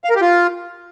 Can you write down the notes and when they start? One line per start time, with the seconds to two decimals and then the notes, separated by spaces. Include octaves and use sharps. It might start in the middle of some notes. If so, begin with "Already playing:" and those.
0.04 F5
0.10 A#4
0.16 G4
0.21 F4